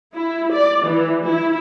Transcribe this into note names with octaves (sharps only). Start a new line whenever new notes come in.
E4
D5
E3
E4